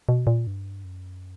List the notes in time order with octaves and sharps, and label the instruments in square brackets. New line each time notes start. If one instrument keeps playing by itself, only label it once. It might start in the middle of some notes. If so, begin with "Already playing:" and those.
[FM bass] B2
A#2
G2
F#2